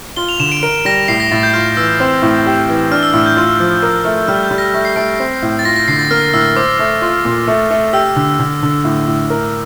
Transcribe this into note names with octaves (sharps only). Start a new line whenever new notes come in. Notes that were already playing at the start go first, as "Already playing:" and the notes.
F4 G7
F7
D3 E7
D7
A#4 D7
G3 A#6
A2 C7
A#6
A2 A6
G6
F4 F6
E3 E6
C4
A2
G4
E3
D4 F6
E6
A2 E6
G6
F4
F3
A#4
A3
G3 F6
G6
G3
A#6
A3 A#6
C7
A3 D7
C4
A2
A6
F4 A#6
A#6
D3 C7
A6
A#3 F6
A2 E6
C5 D6
A3
F4
A#2
A3
A3
G4 E6
D3
D3
D3
A2
A2
A#4